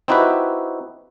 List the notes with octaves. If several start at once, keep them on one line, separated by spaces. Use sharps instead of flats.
C4 D#4 E4 F#4 G4 B4